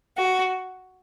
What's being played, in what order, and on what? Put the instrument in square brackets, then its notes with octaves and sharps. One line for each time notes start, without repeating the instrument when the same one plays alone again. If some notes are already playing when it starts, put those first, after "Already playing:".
[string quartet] F#4